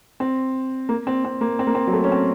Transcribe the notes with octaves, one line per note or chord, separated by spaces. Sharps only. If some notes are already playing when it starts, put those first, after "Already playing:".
C4
A#3
C4
C4
A#3
C4
A#3
C4
F#3
A3
C#4
C4